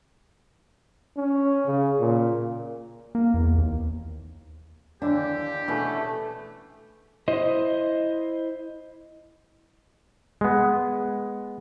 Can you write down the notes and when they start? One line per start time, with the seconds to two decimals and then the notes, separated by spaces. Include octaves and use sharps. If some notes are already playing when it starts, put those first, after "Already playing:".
1.17 C#4
1.66 C#3
2.00 A#2
3.15 A#3
3.34 E2
3.58 D#2
5.02 D#2 D3 E3 D4 G4
5.68 B2 E3 A3 C#4 G#4 B4
7.28 E4 C5 D#5
10.41 G#3 B3